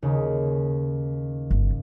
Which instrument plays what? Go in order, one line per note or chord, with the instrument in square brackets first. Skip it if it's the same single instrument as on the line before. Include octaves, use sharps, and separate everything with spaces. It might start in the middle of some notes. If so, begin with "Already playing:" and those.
[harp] D#2 C#3
[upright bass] G1